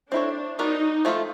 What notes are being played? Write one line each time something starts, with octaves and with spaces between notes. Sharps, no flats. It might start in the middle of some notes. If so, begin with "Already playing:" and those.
C4 D4 E4 A4 C#5
B3 D4 D#4 F#4 A#4
F3 A3 C4 F4